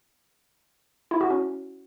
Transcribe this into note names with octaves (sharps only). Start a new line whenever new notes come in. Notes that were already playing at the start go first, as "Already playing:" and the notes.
E4
F#4
C#4